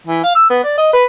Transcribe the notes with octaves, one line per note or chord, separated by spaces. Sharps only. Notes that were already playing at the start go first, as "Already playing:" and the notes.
E3
F5
E6
B3
D5
D#5
B4